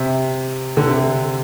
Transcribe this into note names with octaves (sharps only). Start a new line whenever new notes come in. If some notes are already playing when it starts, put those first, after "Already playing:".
Already playing: C3
D3
C3